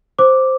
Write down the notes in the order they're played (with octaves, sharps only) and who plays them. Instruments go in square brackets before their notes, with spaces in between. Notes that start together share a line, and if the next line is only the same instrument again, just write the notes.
[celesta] C5 D6